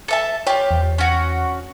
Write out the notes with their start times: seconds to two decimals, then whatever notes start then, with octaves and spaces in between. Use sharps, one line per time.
0.08 A4 E5 A5
0.47 F4 G4 C#5
0.71 E2
0.98 C#4 F#4